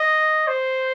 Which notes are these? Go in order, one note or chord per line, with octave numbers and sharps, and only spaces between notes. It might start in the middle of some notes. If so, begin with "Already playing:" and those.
Already playing: D#5
C5